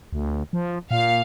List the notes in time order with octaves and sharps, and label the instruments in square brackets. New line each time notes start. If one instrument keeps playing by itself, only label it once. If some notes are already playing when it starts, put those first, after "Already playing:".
[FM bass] D2
F3
[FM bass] A#2 [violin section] F5